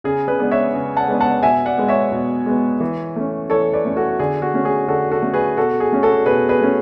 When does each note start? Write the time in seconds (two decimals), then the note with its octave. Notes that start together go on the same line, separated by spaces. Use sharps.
0.04 C#3 G#4
0.28 G#4 B4
0.39 G#3 B3 D4
0.51 C#5 E5
0.74 C#3
0.97 F#5 A5
1.08 G#3 B3 D4
1.21 F#5 A5
1.42 B2 E5 G#5
1.66 D5 F#5
1.77 G#3 B3
1.88 C#5 E5
2.12 B2
2.46 G#3 B3
2.80 E3
3.16 A3 C#4
3.50 E3 A4 C#5
3.73 B4 D5
3.85 A3 C#4
3.96 F#4 A4
4.19 D3 G#4
4.42 F#4
4.54 A3 C#4
4.65 G#4
4.88 D3 F#4 A4
5.12 F#4 A4
5.22 A3 C#4
5.34 G#4 B4
5.57 B2 F#4 A4
5.80 G#4
5.92 A3 C#4
6.03 F#4 A4
6.26 B2 G#4 B4
6.49 G#4 B4
6.61 A3 C#4